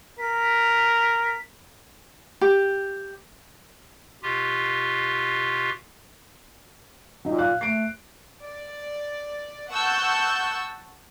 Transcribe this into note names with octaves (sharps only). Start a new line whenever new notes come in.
A#4 B6
G4
B2 F4 G4
A#2 F#3 D#4
F5 F#6
A3 C7 D7
D5
F#5 A5 C#6 E6 G6